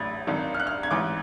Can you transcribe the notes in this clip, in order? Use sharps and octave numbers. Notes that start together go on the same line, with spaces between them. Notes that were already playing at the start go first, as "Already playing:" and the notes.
Already playing: A1 A2 F#3 G#6 A6
G#1 G2 D#3 F#3
F6
F#6
F6
G#6
A1 G#2 E3 D6